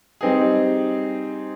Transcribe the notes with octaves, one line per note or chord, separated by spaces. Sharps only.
G3 C4 D#4 G#4